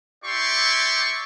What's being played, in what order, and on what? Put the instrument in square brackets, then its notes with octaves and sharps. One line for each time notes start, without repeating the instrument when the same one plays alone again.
[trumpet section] E4 G4 D5 C6 C#6